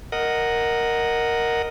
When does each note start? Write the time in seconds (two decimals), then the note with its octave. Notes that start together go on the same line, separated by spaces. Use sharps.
0.12 A#4 D#5 F#5